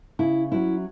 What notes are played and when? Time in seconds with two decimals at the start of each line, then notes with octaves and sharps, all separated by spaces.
0.19 C#3 E4
0.51 F#3 C#4 E4